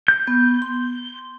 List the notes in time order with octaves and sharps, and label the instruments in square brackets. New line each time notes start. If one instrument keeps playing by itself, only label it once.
[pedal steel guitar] G6
[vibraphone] B3
C6